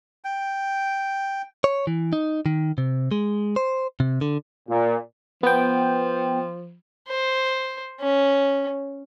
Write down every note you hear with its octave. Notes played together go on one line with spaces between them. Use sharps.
G5
C#5
E3
D#4
D#3
C3
G#3
C5
C3
D3
A#2
F3 B3 G5
C5
C#4